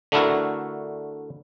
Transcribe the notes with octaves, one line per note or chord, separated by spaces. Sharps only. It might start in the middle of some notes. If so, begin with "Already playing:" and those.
D3 A3 D4 E4 F#4 A#4